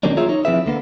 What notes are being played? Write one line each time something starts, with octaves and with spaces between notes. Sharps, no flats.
D#3 F#3 G3 A#3 C#4 D4
F4 G#4 A#4 C#5 E5
D#4 C#5
F3 C4 E4 G#4 B4 E5
D3 A#3 B3